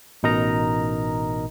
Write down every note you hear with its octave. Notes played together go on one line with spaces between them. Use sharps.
A1 B2 D#4 A#4 D#5 A#5